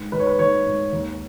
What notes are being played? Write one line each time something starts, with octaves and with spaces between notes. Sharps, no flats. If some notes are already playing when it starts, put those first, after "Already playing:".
Already playing: G#2
D#3 B4
C#5
B4
D#3 C#5
G#2
D#2